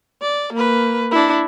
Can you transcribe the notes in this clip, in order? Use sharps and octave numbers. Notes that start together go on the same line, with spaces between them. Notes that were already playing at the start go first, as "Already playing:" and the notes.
D5
A#3 B4
D4 E4